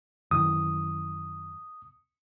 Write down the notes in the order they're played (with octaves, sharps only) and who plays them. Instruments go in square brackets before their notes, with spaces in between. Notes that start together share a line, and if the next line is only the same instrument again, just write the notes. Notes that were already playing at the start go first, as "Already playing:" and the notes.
[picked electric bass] F#2 D#3 E3 [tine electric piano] D#6